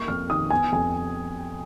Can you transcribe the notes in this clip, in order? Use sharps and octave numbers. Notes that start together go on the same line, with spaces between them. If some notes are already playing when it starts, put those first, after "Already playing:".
Already playing: A#3 C#6
F2 F6
D#3 D#6
B3 G#5
F2 G#5